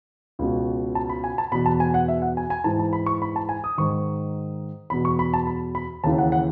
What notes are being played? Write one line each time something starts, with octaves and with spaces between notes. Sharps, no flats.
C#2 B2
A5
B5
G#5
A5
E2 B2 B5
A5
G#5
F#5
E5
F#5
G#5
G#5
G#2 E3 A5
A5
B5
C#6
B5
A5
G#5
D#6
G#2 D#3 C#6
E2 B2 B5
C#6
B5
A5
B5
B5
D#2 C#3 E3 A5
F#5
F#5